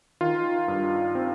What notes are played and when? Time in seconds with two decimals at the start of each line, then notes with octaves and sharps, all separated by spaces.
0.21 D#3 F4
0.68 G2
1.15 C4